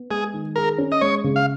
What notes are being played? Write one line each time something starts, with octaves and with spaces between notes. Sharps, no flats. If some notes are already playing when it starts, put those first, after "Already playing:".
Already playing: B3
G#3 G#4
D#3
G#4 A#4
C#4
D#5
G#3 C#5
C#3
F5